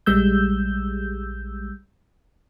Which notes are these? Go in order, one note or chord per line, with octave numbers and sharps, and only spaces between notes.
A#1 G3 G#3 E6 G6